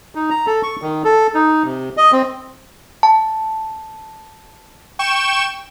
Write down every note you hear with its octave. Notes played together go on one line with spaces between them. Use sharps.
D#4
A#5
A4
C#6
D#3
A4
D#4
C3
D#5
C4
A5
G5 C#6 E7